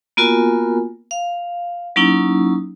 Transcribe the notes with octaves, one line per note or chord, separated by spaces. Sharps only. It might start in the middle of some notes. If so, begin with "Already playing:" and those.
A#3 B3 F4 F#4 A#4 G#5
F5
F#3 A#3 C#4 D#4 E4